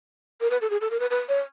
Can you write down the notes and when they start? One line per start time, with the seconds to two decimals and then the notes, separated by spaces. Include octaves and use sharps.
0.41 A#4
0.51 B4
0.62 A4
0.70 G#4
0.81 A4
0.91 A#4
1.00 B4
1.10 B4
1.29 C#5